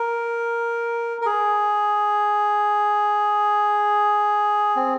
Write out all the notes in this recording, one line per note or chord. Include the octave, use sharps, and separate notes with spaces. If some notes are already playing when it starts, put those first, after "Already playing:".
Already playing: A#4
A#4
G#4
C4